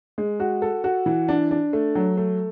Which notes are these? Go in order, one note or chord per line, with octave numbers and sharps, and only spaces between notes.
G#3
F#4
A4
F#4
E3
D4
D4
A3
F#3
A3